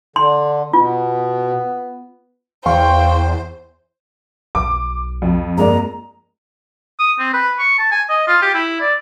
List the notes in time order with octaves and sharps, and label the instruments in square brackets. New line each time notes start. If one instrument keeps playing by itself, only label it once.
[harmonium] D3 [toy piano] C6
[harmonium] B2 [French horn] B3 [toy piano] F4
[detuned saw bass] E2 [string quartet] C5 [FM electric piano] F5 C6 C#6 [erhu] G5
[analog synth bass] B1 [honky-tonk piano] D6
[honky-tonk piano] F2
[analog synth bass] G2 [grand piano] G#3 A#3 D5 [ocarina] A#5
[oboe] D#6
C4
B4
C#6
A5
G#5
D#5
F4
G4
E4
D5